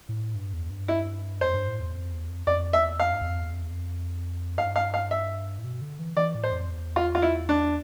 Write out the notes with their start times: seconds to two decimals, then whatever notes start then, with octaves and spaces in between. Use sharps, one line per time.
0.09 A2
0.35 G2
0.53 E2
0.70 G2
0.88 E4
1.41 F2 C5
1.54 G2
1.68 A2
1.80 E2
1.94 F2
2.12 E2
2.29 F2
2.47 F2 D5
2.73 E2 E5
3.00 F2 F5
3.13 G2
3.21 E2
3.26 F2
3.39 E2
3.53 F2
3.62 E2
3.70 F2
4.58 G2 F5
4.76 F5
4.94 F5
5.11 E5
5.58 A2
5.64 B2
5.81 D3
5.99 E3
6.17 E3 D5
6.35 A2
6.44 C5
6.52 F2
6.69 E2
6.96 F4
7.15 F4
7.22 E4
7.49 D4